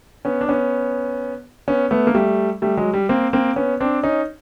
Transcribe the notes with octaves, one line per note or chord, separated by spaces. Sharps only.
B3 C#4
D4
B3 C#4
B3 C#4
A3 B3
A#3
G3 A3
G3 A3
F#3 G#3
G3
A#3 C4
A#3 C4
B3 C#4
C4 D4
C#4 D#4